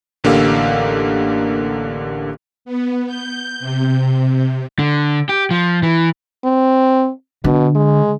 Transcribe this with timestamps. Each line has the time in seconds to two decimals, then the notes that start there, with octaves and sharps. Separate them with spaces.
0.24 A1 D3 A#3 G4 F5 E6
2.65 B3
3.07 G6
3.60 C3
4.79 D3
5.29 G4
5.51 F3
5.83 E3
6.44 C4
7.44 B2 D3
7.75 G#3